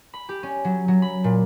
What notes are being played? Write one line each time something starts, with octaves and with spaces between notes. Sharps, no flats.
B5
G4
C#4
F#3
F#3
B5
A#2